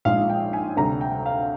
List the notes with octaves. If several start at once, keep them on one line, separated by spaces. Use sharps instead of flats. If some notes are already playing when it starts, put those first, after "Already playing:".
A#1 G#2 F3 G#3 F5
G5
G#5
D2 C3 G3 A#5
G5
F5